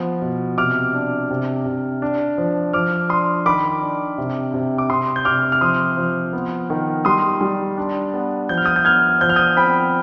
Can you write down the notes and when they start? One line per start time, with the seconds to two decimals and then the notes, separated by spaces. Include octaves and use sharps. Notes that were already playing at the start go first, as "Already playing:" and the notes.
Already playing: F3 B3
0.22 B2
0.58 C3 D6 F6
0.94 D4
1.31 C3
1.66 C3
2.02 D4
2.38 F3
2.73 F3 D6 F6
3.09 D4 C6 D#6
3.45 D#3 B5 D6
3.82 D4
4.18 C3
4.54 C3
4.78 D6
4.90 C3 C6 D#6
5.16 G6
5.25 C3 D6 F6
5.52 F6
5.61 F3 C6 D#6
5.97 F3
6.33 B3
6.70 D#3
7.05 G3 C6 D#6
7.41 G3
7.78 D4
8.14 B3
8.49 F3 G6
8.58 F6
8.65 D#6 G6
8.76 G6
8.85 B3 F6 G#6
9.21 F3 G6
9.29 F6
9.36 D#6 G6
9.57 C4 G5 B5